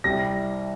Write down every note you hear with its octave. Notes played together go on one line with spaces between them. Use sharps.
C2 C3 G3 A#6